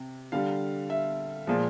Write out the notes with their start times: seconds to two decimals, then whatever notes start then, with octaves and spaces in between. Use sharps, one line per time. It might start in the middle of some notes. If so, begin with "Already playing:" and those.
Already playing: C3
0.32 D3 G3 F5
0.90 E5
1.47 A#2 F3 G#3